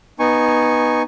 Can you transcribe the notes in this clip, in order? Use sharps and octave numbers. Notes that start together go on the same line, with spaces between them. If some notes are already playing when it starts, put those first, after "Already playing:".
B3 D#4 G#5 C#6